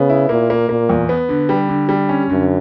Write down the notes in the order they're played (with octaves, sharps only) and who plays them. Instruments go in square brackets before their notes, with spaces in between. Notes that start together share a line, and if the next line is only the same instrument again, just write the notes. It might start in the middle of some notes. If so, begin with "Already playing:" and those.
Already playing: [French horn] C#3 [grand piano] B3
[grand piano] E4
[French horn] A#2 [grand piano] A#3
[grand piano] A#3
[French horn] A#2 [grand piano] A#3
[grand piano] E2
B3
D3
G3
D3
G3
C#4
[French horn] F#2 [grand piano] D3